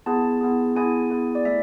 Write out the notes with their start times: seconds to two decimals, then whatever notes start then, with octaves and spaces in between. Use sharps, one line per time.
0.06 B3 E4 G#4 A5
0.41 B3 E4 G#4
0.76 B3 E4 G#4 G#5
1.11 B3 E4 G#4
1.35 D5
1.45 A3 E4 E5